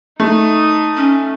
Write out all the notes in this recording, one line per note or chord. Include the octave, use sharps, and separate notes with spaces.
A3 D#4 D#6
C#4